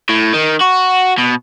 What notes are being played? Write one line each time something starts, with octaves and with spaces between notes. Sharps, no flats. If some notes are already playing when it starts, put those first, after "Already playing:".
A2
D#3
F#4
B2